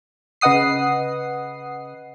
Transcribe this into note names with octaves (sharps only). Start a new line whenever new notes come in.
C#3 B4 D#5 F#5 D#6 C7